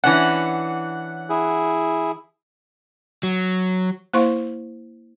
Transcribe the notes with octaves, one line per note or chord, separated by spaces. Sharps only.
E3 C#4 D4 F#5
E4 G#4
F#3
A#3 E4 C5 F5 C6 C#6